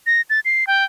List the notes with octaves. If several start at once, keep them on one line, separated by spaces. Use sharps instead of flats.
A#6
A6
C7
G5